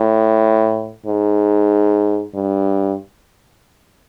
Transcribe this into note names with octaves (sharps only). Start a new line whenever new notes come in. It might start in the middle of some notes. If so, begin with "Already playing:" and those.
Already playing: A2
G#2
G2